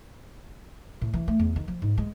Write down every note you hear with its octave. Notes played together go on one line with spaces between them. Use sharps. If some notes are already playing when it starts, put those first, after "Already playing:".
A2
E3
A3
E2
D#3
F3
G#2
G#3